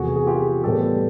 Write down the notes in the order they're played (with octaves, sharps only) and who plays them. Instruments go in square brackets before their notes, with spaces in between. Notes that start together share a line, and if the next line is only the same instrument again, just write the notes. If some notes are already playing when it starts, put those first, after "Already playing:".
Already playing: [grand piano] E2 C3 F3 A3 F#4 G#4
G#4
F4 G4
A2 E3 G3 B3 G4 A4